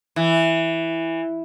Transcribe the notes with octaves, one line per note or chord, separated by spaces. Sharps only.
E3